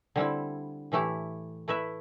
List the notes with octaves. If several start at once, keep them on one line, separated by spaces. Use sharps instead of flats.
D3 G3 C4 E4
A2 E3 A3 E4 G4
A3 E4 B4 E5